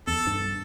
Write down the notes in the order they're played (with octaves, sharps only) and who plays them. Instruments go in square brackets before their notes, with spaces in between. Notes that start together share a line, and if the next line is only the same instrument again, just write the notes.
[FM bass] E2 [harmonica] A4
[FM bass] G2